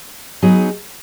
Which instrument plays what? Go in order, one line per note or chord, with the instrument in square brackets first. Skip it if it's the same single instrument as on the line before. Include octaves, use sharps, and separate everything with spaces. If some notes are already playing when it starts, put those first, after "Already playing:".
[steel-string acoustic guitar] F#3 B3 D#4 G#4